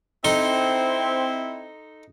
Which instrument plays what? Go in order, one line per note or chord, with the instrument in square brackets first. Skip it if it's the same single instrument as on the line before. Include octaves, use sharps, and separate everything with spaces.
[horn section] C4 E4 [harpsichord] D#4 A4 C6